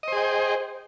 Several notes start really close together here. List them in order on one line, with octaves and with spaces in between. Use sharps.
D#5 C5 G#4 G5